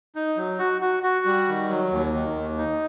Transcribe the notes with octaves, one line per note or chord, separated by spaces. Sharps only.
D#4
F#3
F#4
F#4
F#4
G3
D#3
F#3
D#2
D#3
D#2
D#4